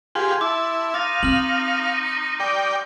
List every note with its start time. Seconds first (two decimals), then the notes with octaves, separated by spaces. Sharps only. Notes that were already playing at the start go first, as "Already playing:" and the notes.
0.15 F4 G4 G#4 C6
0.41 E4 A5 D6
0.94 D#4 F5 D6 A6
1.23 C4 F6 F#7
2.40 D5 G5